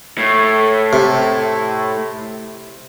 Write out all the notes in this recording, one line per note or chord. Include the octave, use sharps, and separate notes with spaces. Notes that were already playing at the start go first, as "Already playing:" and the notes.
A2
C3